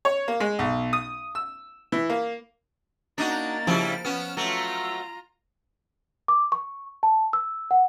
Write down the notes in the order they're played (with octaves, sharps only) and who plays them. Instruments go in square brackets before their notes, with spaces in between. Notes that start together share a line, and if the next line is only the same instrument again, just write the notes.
[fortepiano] C#5
A#3
G#3
B1
D#6
E6
E3
A#3
[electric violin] A#3 A6 [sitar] D4 D#4 F#4
[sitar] C#3 G3 E4 [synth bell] F3 F6 D7
[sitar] B3 C#4 [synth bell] F6 E7
[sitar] F#3 A3 [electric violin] F4 A#5
[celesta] D6
C#6
A5
E6
F#5